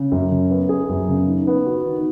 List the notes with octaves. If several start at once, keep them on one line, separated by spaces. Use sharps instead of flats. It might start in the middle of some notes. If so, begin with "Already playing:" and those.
Already playing: C#3
F#2
C#3
B3
G#4
F#2
C#3
D#3
B3
F#4
D#3